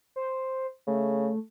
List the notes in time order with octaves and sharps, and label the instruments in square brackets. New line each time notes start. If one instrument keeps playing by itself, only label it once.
[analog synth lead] C5
[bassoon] C#3 [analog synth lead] A3